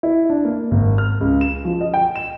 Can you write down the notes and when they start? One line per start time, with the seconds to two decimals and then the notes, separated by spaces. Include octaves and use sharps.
0.03 E4
0.30 D4
0.45 A#3
0.71 G#1
0.98 F6
1.21 C#2
1.41 E7
1.65 F3
1.81 D#5
1.94 G5
2.16 E7